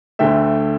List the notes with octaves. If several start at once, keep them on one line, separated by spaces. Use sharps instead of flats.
D2 D3 A3 E5 G5